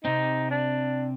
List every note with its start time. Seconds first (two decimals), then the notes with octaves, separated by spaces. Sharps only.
0.05 C3 C4 D#4
0.51 D4